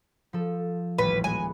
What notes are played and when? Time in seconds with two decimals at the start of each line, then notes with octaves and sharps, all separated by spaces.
0.33 F3 A4
0.98 D#1 A1 G3 B4
1.24 G#3 B3 G#5